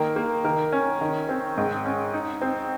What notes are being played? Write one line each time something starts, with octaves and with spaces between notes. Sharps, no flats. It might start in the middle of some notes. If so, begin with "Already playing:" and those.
Already playing: D#3 A#3 A#4
A#3
D#3 A#4
C#4
D#3
C4
G#2
C#4
D#4
C4